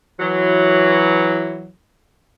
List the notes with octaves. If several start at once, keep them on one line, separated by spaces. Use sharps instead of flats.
E3 F#3